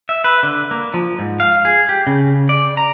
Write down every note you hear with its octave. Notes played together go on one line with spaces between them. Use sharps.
E5
B4
D3
A#3
F3
G#2
F5
G#4
G4
C#3
D5
A#5